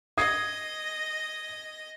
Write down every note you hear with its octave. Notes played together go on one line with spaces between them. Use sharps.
D#5 D#6 G#6 C7